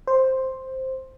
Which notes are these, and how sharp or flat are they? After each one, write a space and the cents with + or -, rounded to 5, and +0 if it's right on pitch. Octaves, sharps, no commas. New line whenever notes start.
C5 +5